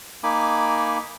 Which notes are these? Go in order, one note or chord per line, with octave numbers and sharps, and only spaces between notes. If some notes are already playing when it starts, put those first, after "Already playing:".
A#3 D#4 G#5 B5 D6